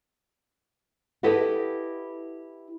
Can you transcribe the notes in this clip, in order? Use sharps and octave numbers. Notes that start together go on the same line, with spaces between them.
E4 G4 A4 B4 D#5 F#5